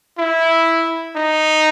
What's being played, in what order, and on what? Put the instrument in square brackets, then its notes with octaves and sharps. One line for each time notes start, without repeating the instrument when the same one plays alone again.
[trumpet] E4
D#4